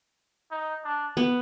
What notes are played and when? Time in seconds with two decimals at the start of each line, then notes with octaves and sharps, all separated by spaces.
0.51 D#4
0.84 D4
1.17 B3